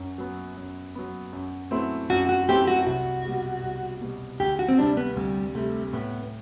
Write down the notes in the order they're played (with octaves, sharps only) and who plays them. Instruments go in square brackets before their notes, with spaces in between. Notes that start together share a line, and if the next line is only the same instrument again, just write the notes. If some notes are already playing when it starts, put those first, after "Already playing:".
Already playing: [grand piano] F#2
F#3 B3
F#2
F#3 B3
F#2
F#3 A3 C4 E4
[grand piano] F#2 [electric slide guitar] F#4
[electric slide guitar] F#4
[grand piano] F#3 A3 C4 E4 [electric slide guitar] G4
[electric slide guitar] F#4
[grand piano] C2 [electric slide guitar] F#4
[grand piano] B2 G3
C2
B2 G3
[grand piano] D2 [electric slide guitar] G4
[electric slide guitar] F#4
C4
[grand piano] C3 G3 [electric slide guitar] D4
[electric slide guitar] B3
[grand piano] D2 [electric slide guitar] G3
[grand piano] C3 G3 [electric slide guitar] A3
[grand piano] A2 [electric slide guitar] B3